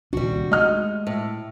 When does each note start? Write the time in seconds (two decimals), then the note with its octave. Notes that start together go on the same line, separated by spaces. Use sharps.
0.13 D#1 C2 G3 D4 F#4
0.52 G#3 A3 D#5 F6
1.07 A2